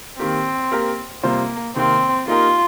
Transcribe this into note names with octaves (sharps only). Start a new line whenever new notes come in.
D#3 A#3 C4 G4
A#3 G4 A#4
C3 G3 A#3 C4 F4 C5
C3 D#3 A#3 C4
A#3 D#4 F4 G4 A#4